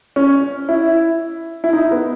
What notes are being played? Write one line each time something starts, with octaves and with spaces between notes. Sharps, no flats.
C#4
E4
E4
D#4
B3